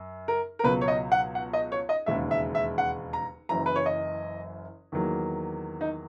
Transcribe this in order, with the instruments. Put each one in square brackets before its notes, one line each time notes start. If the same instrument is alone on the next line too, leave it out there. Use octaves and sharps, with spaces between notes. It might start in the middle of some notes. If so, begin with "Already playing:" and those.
Already playing: [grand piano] F#2
A#4
A#4
C#2 B2 F#3 B3 B4
C#5
D#5
F#5
F#5
D#5
C#5
D#5
E1 D#2 C#3 G#3 E5
E5
E5
F#5
A#5
F#1 F#2 E3 A#5
B4
C#5
D#5
E2 D#3 F#3 A#3
D#4